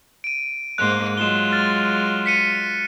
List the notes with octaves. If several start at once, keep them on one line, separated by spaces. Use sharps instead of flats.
D7 D#7
G#2 A#3 C5 F#6
F#3 G#3 F4 E7 G7
F6 A6
B6 C#7 D#7